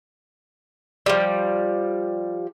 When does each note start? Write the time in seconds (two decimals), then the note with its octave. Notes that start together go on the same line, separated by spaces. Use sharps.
1.06 F3 G3